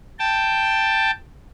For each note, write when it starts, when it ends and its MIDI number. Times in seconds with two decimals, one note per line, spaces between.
0.19 1.11 79
0.19 1.11 81